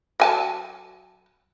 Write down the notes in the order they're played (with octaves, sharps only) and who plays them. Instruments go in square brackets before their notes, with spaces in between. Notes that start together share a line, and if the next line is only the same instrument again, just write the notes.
[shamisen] F#3 G#5 A5